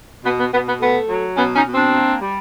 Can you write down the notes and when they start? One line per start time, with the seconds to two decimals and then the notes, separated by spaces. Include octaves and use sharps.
0.24 B2 B3
0.39 B3
0.52 B2 B3
0.67 B3
0.80 A3 B3
1.08 F#3
1.36 B2 B3 C#4
1.55 C#4 D#4
1.65 B2
1.74 C4 D4
1.93 A#3
2.21 G3